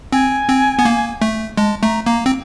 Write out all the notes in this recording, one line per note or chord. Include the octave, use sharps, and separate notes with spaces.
C4 G#5
C4
B3
A#3
A3
G#3 A5
A3 A#5
A#3 A#5
C4